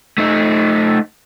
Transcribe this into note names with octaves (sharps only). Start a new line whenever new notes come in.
A3 D#4